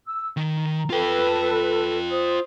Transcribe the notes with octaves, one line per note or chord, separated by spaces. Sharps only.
E6
D#3 A#5
F4 A4 B4 G5
C5 D#6